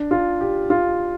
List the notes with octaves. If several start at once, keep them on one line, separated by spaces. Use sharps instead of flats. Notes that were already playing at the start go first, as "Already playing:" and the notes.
Already playing: D4
F4
G4
F4